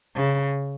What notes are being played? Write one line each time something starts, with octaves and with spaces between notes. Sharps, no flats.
C#3